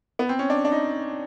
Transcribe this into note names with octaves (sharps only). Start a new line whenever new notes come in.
B3
C4
C#4
D4
D4
D#4